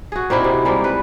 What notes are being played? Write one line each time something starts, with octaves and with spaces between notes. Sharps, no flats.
F#4 G#4
A#2 C4 D#4 E4
C3
G3 G#3 A#3
B4